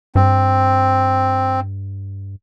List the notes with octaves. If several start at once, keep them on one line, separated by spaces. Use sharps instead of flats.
G2 C4